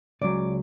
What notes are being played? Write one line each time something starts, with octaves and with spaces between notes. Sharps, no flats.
C#2 C#3 F#3 D5